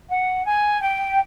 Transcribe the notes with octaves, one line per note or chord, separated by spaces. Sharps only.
F#5
G#5
G5